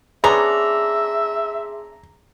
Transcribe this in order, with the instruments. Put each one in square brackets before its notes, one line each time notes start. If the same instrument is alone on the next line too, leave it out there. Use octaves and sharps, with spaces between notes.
[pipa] B3 C#4 D4 [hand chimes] G#4 C6 [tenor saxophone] E5 [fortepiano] A#5